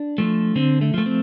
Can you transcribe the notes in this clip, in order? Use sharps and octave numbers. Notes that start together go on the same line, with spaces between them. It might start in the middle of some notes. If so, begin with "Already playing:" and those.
Already playing: D4
F3 A3
D3 C4
A3
F3 A3
C4